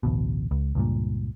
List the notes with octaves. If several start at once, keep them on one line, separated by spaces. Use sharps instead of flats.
A1 D2 B2
C#2
C#2 G2 A#2